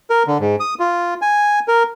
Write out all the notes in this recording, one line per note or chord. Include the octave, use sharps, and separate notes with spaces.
A#4
D3
G#2
D#6
F4
G#5
A#4